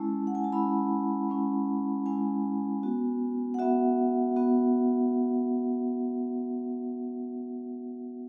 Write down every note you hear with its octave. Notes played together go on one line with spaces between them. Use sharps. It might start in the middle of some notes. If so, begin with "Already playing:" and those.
Already playing: G#3 C#4 E4 A5
F#5
G#5
A5
G#3 C#4 E4 B5
G#3 C#4 E4
G#3 C#4 E4 G#5
B3 F#4
F#5
B3 F#4 E5
B3 F#4